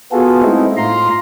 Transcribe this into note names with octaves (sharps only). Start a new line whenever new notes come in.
B3 F4 F#4 G#4 A4
G#3 A3 C4 D#4 E4
A2 F4 A#5 C6